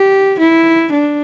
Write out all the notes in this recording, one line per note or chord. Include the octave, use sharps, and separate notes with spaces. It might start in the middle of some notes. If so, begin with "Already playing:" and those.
Already playing: G4
E4
D4